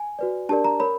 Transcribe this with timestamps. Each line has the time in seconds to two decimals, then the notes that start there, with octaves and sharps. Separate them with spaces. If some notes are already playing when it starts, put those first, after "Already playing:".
Already playing: G#5
0.19 F#4 B4 D5
0.49 D4 G4 A#4 D5 A5
0.65 A#5
0.80 A#4 C#5 B5